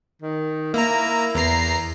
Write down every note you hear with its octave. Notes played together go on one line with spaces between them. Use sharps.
D#3
A#3 E4 A#5
E2 A#5 C7